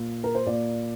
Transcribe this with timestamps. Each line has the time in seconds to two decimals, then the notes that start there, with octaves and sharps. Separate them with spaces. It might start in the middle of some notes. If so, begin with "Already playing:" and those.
Already playing: A#2
0.24 A#4
0.35 C5
0.46 A#2 D5